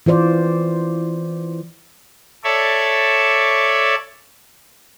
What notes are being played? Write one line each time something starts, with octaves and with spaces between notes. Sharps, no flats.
E3 F4 C5 D5
A4 C#5 D5 E5